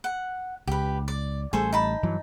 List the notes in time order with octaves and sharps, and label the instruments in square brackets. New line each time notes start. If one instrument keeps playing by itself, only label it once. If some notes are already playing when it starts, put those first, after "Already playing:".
[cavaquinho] F#5
[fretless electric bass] C#2 [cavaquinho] G4 B4
[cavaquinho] D5
[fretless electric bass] A1 G3 A3 [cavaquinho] G#4 A4 C5
[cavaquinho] D#4 A5 B5
[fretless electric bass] G2 E3 F#3